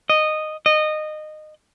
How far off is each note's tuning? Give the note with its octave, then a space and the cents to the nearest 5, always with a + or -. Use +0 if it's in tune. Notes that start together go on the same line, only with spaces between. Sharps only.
D#5 -10
D#5 -20